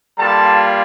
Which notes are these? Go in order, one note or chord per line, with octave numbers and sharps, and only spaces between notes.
G3 A#3 F4 A4 A5